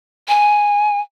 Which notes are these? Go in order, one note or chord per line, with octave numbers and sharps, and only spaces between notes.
G#5